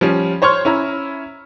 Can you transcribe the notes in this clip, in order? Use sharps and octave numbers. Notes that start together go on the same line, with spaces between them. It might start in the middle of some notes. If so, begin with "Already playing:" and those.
F3 G3 C#4
C5 C#5 C6 C#6 F6
C#4 E4 A#5